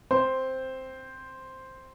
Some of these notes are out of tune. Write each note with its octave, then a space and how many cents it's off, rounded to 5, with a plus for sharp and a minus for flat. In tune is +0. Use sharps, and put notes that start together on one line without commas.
C4 +0 C5 +0